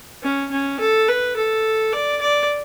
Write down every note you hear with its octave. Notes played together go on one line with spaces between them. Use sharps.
C#4
C#4
A4
B4
A4
D5
D5